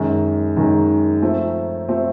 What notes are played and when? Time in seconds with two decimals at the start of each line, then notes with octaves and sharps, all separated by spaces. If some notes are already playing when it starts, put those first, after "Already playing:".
Already playing: F#2 D#3 G#3
0.56 F#2 D#3 G#3
1.22 F3 A3 C4
1.89 F3 A3 C4